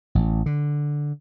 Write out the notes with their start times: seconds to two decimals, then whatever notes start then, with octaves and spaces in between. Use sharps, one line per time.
0.15 A1
0.46 D3